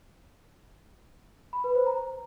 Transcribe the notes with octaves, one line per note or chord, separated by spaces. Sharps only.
B5
B4
C5
A#5